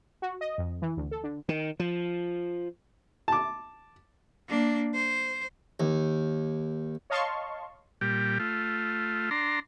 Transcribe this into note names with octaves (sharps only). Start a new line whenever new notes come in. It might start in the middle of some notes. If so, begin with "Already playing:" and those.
F#4
D#5
F2
E3
D2
A4
D3
D#3
F3
A5 D6
A#3 D4
C5
D#2
C#5 D#5 F5 A5 C6 C#6
A#2 G3 G4
A3 F4
D4 A#5 C6